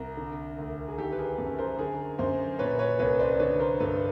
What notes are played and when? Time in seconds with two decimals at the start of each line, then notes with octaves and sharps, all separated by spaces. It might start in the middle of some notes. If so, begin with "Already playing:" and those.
Already playing: C2 A#4
0.17 D3
0.58 D2
0.88 G#4
0.98 D#3 G4 A4
1.12 B4
1.18 G#4 A#4
1.38 F#2
1.59 A#4 C5
1.79 D3 G#4 A#4
2.18 F#2 A#4 C5
2.59 A#2 B4 C#5
2.79 B4 C#5
2.99 C2 B4 C#5
3.19 C5 D5
3.39 D3 B4 C#5
3.59 A#4 C5
3.80 G2 A4 B4